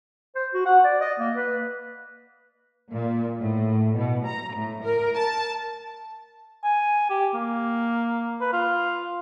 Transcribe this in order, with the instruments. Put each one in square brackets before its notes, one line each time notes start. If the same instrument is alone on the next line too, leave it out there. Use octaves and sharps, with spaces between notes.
[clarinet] C5
F#4
F#5
D5
D#5
A#3
B4
[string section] A#2
A2
B2
A#5
A2
A#4
A5
[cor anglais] G#5
G4
A#3
B4
F4